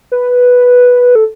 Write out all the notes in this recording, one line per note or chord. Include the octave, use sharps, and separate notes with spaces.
B4
A4